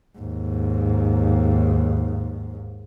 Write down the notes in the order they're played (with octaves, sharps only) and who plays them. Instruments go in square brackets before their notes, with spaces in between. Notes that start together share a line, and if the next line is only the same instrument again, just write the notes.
[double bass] D#2 G#2